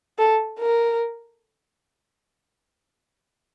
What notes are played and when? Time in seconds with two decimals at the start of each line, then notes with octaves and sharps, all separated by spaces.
0.19 A4
0.60 A#4